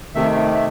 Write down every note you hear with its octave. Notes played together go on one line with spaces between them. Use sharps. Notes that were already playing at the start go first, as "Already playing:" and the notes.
C3 D#3 A3 E5
E5